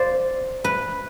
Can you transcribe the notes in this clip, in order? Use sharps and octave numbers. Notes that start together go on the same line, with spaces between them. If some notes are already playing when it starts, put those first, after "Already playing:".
Already playing: C5 D5 F5
B4